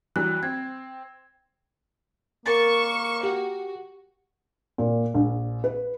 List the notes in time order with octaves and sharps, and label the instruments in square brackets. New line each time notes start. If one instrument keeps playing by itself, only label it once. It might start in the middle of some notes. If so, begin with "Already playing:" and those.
[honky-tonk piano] E3 F#3 G3 [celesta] F#6
[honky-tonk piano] C4 [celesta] G#6
[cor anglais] A#3 [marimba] A#4 A6 [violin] C#6 E7
[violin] F#4 [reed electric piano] G4
[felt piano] A#2
A#1
B4